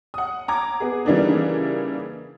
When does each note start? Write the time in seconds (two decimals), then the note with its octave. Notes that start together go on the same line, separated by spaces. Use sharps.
0.14 F#5 D#6
0.48 A#5 D6 G#6
0.80 B3 G#4
1.05 C#3 E3 G3 A#3 D4 D#4